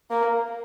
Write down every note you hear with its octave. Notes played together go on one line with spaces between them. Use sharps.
A#3